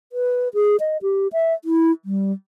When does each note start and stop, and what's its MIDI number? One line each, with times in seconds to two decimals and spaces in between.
0.12 0.49 71
0.54 0.76 68
0.80 0.97 75
1.02 1.28 67
1.33 1.53 76
1.65 1.91 64
2.05 2.32 55